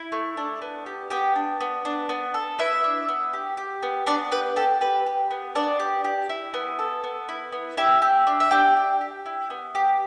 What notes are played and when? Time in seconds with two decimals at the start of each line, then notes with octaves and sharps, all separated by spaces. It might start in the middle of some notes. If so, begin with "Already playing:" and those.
Already playing: E4
0.12 A3
0.37 D4
0.62 B3
0.86 G4
1.10 B3 G4 G5
1.36 D4
1.61 B3
1.85 D4
2.09 B3
2.34 A4
2.59 B3 E4 E5
2.84 D4
3.09 B3
3.33 G4
3.57 G4
3.83 B3
4.06 B3 D4 D5
4.32 G4 B4
4.56 G4 A4
4.81 G4 B4
5.06 G4
5.31 B3
5.55 B3 D4 D5
5.80 G4
6.04 G4
6.29 E4
6.54 B3
6.79 A4
7.04 B3
7.29 E4
7.52 B3
7.77 E4 G4 E5
8.02 G4
8.27 D4
8.40 E5
8.51 D4 G4 G5
8.77 G4
9.01 G4
9.26 E4
9.50 B3
9.75 G4